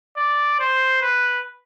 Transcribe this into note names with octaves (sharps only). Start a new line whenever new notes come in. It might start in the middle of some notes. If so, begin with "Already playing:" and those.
D5
C5
B4